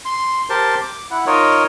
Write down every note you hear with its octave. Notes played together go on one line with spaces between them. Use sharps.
C6
G4 A#4 C5 A5 C6
D6
E4 F#5
D#4 F4 A#4 C#5 D#5